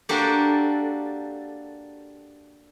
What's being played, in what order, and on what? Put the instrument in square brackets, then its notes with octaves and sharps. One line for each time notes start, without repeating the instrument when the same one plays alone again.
[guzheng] A#3 D4 F#4 G4 A4